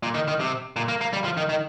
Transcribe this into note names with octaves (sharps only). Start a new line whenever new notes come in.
A#2
D#3
D#3
C3
A#2
A#3
A#3
G3
F3
D#3
D#3